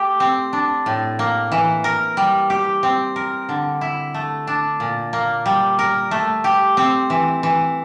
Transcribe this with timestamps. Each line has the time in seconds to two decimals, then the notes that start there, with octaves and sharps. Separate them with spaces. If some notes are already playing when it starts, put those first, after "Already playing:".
Already playing: A3 G4
0.20 C4
0.53 D4
0.86 A2
1.19 A#3
1.52 E3
1.84 A#4
2.17 G3
2.50 G4
2.83 C4
3.16 A#4
3.49 D3
3.81 E4
4.14 A3
4.47 D4
4.80 A#2
5.13 A#3
5.46 G3
5.79 A#4
6.11 A3
6.44 G4
6.77 C4
7.10 E3
7.43 E3